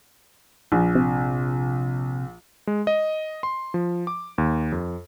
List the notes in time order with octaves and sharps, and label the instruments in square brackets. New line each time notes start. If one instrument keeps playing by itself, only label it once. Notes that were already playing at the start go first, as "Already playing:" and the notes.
[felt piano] A#1
[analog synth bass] C3
[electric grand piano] G#3
D#5
C6
F3
D6
D#2
F2